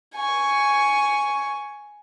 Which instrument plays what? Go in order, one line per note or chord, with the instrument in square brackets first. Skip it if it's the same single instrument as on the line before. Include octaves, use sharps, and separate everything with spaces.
[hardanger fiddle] G#5 C#6